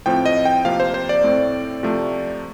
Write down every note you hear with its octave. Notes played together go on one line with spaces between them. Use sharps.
A2 F3 C4 G5
D#5
G5
C3 F3 A#3 F5
C5
C5
D5
A2 A3 C4
C3 F3 A3